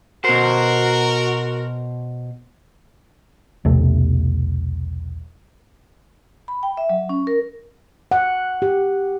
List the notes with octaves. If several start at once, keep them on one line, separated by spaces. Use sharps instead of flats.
B2 F#4 A#4 C5
B1 E2 C3 A3
B5
G5
E5
F#3
C#4
A#4
F#5
G4